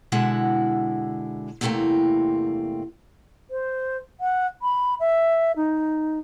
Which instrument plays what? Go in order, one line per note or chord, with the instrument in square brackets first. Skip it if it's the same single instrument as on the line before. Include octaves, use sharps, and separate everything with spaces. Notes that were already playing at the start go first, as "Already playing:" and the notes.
[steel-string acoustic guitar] B2 D3 G#3 E4 F#5
E2 G2 C3 A3 A#3 C4
[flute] C5
F#5
B5
E5
D#4